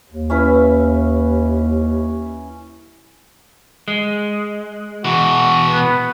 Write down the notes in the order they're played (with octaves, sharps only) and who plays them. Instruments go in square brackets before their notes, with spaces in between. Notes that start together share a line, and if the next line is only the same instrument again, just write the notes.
[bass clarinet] D#2
[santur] C#4 E4 B4
[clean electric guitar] G#3
[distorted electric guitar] B2 E3 [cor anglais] F#4
[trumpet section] B3